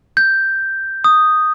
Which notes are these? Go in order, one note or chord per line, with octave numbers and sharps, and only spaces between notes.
G6
D#6